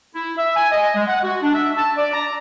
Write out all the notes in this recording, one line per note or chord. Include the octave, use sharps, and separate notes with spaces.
E4
E5
G#5
D#5
G#3
F#5
F#4
D4
E5
A5
D5
A#5